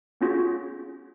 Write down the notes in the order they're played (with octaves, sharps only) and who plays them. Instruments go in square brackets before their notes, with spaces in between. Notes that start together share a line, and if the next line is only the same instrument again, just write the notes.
[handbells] B3 C#4 F4 F#4 G#4